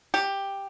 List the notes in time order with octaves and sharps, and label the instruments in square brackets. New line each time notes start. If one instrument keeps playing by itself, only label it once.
[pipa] G4